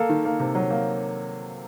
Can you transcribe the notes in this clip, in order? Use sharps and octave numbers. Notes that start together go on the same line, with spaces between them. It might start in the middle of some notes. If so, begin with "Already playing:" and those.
Already playing: A#3 A4
D#3
A#3
C3
F#3
A#3